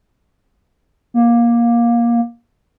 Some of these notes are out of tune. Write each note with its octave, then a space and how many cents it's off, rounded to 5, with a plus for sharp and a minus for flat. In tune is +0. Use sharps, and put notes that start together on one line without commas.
A#3 +15